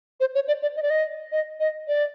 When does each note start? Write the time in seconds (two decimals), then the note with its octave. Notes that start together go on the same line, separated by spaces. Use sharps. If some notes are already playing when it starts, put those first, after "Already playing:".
0.20 C5
0.35 C#5
0.48 D5
0.62 D5
0.77 D#5
0.83 D5
0.90 D#5
1.32 D#5
1.60 D#5
1.88 D5